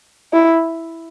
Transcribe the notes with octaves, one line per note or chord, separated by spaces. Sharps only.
E4